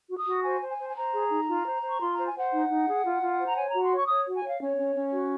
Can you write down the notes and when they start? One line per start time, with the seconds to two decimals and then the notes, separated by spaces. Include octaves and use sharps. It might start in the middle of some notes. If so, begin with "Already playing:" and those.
0.09 F#4
0.18 D#6
0.26 F#4
0.44 C5 G#5
0.61 C5
0.69 G#5
0.78 C5
0.90 G#5
0.96 C5 A#5
1.13 G#4
1.30 D#4
1.48 F4
1.65 C5
1.82 C5
1.89 C#6
2.00 F4 C6
2.13 C5 A#5
2.26 G#5
2.35 C5 F#5
2.52 D#4
2.69 D#4
2.87 G#4
3.04 F4
3.22 F4
3.39 C5
3.46 A#5
3.56 C#5 G#5
3.70 F#4 A#5
3.82 C6
3.91 C#5 C#6
4.08 C#5 D#6
4.26 F#4
4.35 G#5
4.43 C#5 F5
4.60 C#4 C#5
4.77 C#4
4.95 C#4
5.12 F#4